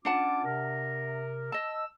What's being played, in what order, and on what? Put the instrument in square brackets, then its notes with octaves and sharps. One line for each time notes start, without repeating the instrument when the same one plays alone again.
[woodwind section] C#4 F4 D6 [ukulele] D4 F#5 A5
[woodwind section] C3 A#4
[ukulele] D#5 A5 [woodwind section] E6